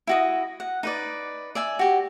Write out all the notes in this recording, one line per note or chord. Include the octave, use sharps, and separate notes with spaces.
E4 F#4 D#5
F#5
D#4 B4 D5
D5 E5 G#5
F#4 G4